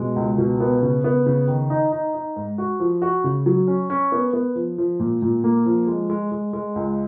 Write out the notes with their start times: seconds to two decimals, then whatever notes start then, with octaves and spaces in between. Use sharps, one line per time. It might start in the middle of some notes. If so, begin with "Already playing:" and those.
Already playing: B2 G#3
0.16 C#2
0.38 B2
0.60 B3
0.82 C#3
1.04 B3
1.26 C#3
1.48 D#3
1.70 D#4
1.92 D#4
2.14 D#4
2.36 G#2
2.58 F#4
2.80 F3
3.02 F#4
3.24 C#3
3.46 F#3
3.67 C#4
3.90 C#4
4.12 B3
4.33 B3
4.55 F3
4.78 F3
5.00 A#2
5.22 A#2
5.44 A#3
5.66 F3
5.87 G#3
6.10 G#3
6.32 G#3
6.53 G#3
6.75 C#2